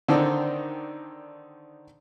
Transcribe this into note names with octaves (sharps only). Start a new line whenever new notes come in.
D3 D#3 C4 D4 D#4